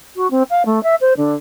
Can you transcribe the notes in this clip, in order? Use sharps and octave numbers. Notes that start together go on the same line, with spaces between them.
F#4
C4
F5
A3
E5
C5
D3